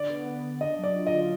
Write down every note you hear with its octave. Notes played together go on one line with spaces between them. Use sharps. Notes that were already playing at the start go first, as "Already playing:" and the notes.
Already playing: D3 D5
B3
B3
D3
D4 D#5
F#3
D5
F4
D#5
D3